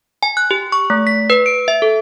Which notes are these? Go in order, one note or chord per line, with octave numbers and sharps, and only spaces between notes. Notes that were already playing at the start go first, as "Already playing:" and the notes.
G#5
F#6
G4
C#6
A3
B6
B4
D7
E5
A4